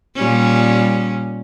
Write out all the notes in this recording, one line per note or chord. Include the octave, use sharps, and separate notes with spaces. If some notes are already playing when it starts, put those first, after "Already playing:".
A#2 G3 C#4